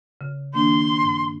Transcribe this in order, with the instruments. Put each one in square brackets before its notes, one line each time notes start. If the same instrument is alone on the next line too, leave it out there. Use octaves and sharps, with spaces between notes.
[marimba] C#3
[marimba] D#3 A#3 D4 [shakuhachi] C6
[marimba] G2